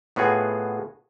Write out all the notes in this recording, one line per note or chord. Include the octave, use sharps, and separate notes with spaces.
A2 B3 F4 F#4 G#4